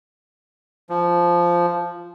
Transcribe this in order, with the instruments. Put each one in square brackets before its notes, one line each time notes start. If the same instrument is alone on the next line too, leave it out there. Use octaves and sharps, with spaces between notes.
[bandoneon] F3